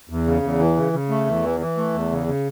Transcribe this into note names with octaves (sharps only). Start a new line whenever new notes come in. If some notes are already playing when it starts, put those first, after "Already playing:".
E2
C#3
E2
E3
C#3
C#3
A3
E2
E3
E3
A3
E2
C#3
C#3